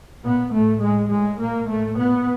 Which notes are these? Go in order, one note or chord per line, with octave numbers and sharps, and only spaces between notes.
A#2 B3
A2 A3
A2 G#3
A2 G#3
A#2 A#3
A2 A3
A#2 B3